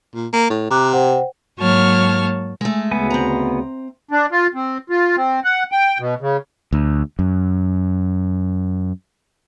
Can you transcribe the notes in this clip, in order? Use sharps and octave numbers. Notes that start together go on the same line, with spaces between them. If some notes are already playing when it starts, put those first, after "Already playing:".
A#2
A#3
A2
C3 A#5 D6 F#6
C5 F#5 G5
G#2 F#3 A#3 C#5 A5 F6
G#3 A3
D2 C#3 B3 G#5
C4 A#5
D4
F4
C4
F4
C4
F#5
G5
B2
C#3
D2
F#2